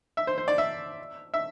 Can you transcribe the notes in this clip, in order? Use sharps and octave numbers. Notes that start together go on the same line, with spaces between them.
E5
C5
C5
D5
E5
E5